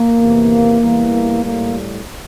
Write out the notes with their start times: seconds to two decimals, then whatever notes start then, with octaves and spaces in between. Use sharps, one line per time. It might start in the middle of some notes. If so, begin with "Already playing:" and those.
Already playing: A#3
0.20 E2 C3 E3
0.80 E2 E3 G3
1.42 A2 G3 A#3